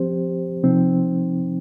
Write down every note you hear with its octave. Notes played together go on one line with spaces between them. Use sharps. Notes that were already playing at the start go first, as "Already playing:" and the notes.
Already playing: F3 C4 G4 C5
C3 F3 C4 D#4